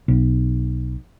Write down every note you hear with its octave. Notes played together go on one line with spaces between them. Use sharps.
B1